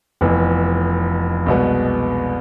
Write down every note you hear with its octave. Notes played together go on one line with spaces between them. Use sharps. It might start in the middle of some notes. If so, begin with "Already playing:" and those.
F1 F2 E3 B3
C2 B2 G#3 B3